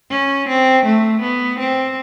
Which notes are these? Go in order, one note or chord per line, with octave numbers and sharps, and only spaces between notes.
C#4
C4
A3
B3
C4